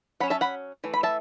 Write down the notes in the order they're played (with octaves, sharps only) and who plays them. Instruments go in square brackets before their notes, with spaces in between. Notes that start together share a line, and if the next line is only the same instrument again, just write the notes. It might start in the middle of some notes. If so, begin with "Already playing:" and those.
[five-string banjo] F#3 C#4 F#5 B5
E5 A5
F#5 B5
E3 A3
B5
E5 A5